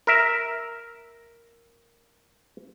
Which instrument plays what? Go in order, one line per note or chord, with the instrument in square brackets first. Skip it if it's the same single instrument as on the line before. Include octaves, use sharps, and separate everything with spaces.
[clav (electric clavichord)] A#4 E5